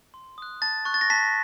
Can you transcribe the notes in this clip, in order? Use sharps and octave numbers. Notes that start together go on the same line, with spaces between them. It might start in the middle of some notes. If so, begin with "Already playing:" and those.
C6
D#6 F#6
A5 A6
C#6 F#6
A6
A#6
A5 B6